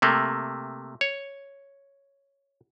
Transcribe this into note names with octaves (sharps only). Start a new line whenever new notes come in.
C3 A3 A#3
C#5